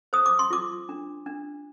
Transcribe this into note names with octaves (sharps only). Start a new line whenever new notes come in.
C5 D#6
D6
C6
F4 D6
D4
D4